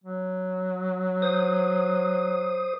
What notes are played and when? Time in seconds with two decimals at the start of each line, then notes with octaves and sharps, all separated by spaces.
0.04 F#3
1.22 C5 D#6